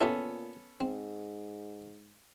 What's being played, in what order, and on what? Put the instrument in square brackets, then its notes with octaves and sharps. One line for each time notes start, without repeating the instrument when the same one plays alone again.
[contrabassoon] A#2 [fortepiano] B3 C#4 A4 [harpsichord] E4 F4 G4
[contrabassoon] G#2 [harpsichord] C4